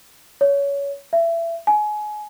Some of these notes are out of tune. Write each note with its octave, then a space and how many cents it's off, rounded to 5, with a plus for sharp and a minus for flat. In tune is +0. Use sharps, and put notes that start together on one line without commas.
C#5 +20
E5 +25
G#5 +25